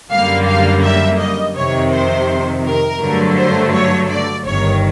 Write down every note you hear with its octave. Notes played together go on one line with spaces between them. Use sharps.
F#2 D3 G3 A#3 F5
F5
E5
D#5
F2 C3 D#3 C#5
C5
A#4
G2 D3 F#3 A3
C5
C#5
D5
G1 G2 D#3 C#5